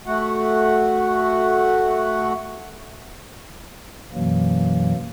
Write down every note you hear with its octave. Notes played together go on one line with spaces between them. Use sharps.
A3 F#4 F#5
F#2 B2 E3 F#3 A#3